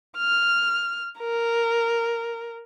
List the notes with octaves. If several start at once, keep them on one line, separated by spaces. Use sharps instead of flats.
F6
A#4